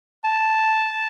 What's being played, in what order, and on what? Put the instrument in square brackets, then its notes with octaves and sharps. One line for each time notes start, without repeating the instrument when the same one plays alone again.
[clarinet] A5